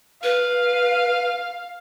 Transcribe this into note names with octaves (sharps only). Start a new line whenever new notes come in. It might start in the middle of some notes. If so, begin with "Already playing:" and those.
B4 F5